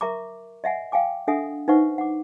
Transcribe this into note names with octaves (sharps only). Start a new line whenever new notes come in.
A#4 E5 A#5 C#6 D6
D#5 E5 F#5 G#5
F5 G5 G#5 D6
D4 A4 E5 F#5 G#5 D#6
D#4 B4 C5 E5 F#5 C#6
F#5 D6